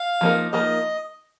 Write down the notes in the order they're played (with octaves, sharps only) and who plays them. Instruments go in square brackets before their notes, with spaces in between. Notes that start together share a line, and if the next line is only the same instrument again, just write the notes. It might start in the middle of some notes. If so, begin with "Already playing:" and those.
Already playing: [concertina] F5
[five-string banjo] F3 A#3 D#4 A#4
[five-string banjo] F3 A#3 D#4 A#4 [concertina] D#5